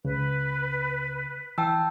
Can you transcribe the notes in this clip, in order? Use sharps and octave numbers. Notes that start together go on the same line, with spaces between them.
C#2 C#3 B4
E3 G5 A5 E6